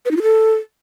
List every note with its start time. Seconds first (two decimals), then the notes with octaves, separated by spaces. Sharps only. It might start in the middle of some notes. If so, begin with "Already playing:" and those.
0.05 B4
0.11 D#4
0.17 F4
0.22 A4